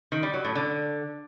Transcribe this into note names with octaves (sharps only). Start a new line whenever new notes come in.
D#3
G3
F#3
A2
D3